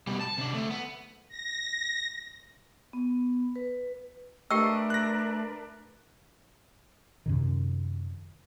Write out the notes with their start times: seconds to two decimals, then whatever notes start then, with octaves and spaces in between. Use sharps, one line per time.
0.07 B2 G3
0.21 A5
0.38 C3 D4
0.54 D3 A3
0.71 B3
1.28 A#6
2.93 B3
3.56 B4
4.51 A3 D4 G4 A#4 B4 D#5 G5 E6
4.90 F#6 A#6
7.26 F#2 C3 D#3